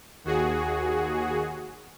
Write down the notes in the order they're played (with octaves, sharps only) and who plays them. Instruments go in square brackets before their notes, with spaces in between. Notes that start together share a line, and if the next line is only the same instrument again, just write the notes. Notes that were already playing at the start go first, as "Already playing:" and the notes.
[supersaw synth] D#2 F#4 G#4